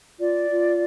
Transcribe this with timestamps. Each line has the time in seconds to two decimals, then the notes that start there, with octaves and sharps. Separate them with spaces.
0.20 F4 D5
0.50 F4